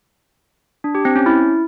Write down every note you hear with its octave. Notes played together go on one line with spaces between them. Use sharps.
D4
G4
C4
C#4
E4